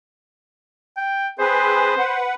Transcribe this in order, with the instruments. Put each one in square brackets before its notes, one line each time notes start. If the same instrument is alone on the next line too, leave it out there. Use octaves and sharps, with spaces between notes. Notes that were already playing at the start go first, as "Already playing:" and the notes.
[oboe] G5
[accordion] C4 G#4 B4 [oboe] C5
[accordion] B4 F#5